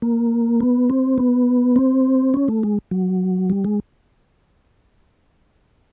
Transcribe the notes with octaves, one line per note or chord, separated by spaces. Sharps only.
A#3
B3
C4
B3
C4
C#4
A3
G#3
F#3
G3
G#3